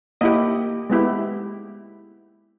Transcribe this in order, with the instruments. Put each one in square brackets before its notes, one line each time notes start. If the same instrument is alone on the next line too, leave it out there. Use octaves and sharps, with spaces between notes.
[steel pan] A#3 E4 G4 D#5
G#3 B3 E4 G4